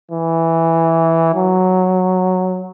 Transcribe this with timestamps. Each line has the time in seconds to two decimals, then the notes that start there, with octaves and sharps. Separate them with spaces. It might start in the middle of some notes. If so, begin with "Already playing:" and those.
0.11 E3
1.35 F#3